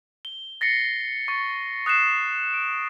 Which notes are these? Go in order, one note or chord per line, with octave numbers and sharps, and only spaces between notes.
G7
A6 A#6 C7 C#7
C#6 A6
D#6 F#6 C7 E7
D7